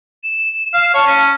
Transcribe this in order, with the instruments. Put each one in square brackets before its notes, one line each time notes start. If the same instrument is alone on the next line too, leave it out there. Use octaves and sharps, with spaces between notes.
[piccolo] E7
[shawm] F5
[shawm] C#5 [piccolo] A5
[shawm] C#4